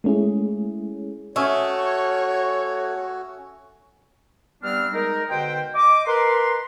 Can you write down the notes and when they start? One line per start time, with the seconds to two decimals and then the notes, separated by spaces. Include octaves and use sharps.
0.04 G#3 A3 C#4 E4 G#4
1.36 A3 C#4 F#4 C#5 E5 D#6
4.63 G2 G3 B3 C4 D4 F6
4.94 G#3 D#4 A#4
5.29 B2 D3 B4 C5 G5
5.75 D#5 D6
6.06 A#4 B4 C6